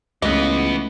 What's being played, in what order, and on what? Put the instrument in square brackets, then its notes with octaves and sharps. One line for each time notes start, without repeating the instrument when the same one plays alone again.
[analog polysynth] C#2 [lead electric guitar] E3 B3 [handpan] G#3 A3 C#4 [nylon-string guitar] D#5